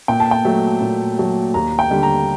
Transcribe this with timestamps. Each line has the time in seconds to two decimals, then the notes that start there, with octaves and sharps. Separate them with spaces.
0.08 A#2 G5
0.20 A5
0.31 G5
0.45 F#3 A3
0.81 A#2
1.18 F#3 A3
1.54 D#2 A#5
1.79 G5
1.90 D3 G3
2.03 A#5